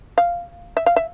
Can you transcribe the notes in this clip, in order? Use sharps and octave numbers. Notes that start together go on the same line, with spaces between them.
F5
E5
F5
E5